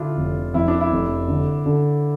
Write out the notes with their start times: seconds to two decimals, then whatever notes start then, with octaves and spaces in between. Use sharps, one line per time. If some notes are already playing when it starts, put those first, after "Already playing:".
Already playing: D3 D4 E4 F4
0.17 F1
0.54 F2 E4
0.68 D4
0.80 E4
0.92 F1
1.28 D3
1.66 D3